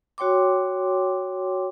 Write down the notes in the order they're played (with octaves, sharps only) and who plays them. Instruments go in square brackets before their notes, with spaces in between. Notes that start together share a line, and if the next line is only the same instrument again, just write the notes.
[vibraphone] F#4 C#5 G5 C6 D6